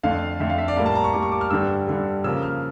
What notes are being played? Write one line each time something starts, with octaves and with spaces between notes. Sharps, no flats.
F2 D3 A3 F5
F2 D3 A3 E5
F5
E5
D5
A2 G3 A#3 F5
A5
A#5
C#6
A2 G3 A#3 D6
C#6
D6
F6
G2 D3 G3 E6
G2 D3 G3
C#3 F3 A#3 E6
F6